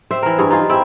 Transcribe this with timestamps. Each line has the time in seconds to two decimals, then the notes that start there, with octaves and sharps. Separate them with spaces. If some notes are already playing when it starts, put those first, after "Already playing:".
0.11 C4 C5 E5
0.23 E3 A#4
0.38 G2 G#4
0.51 D#4 F4 G#4
0.69 C4 E4 G4 E5